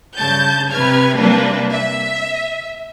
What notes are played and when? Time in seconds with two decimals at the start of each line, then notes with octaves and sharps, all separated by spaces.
0.16 G2 C#3 A5 G6
0.71 C3 B4 F6 G#6
1.15 C3 G3 A#3 D4 B4
1.72 E5